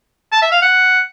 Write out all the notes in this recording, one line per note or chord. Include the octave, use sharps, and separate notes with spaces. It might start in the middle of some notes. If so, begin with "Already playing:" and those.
A5
E5
F5
F#5